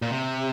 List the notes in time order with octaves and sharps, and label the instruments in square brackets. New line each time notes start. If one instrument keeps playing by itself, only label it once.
[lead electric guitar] A#2
C3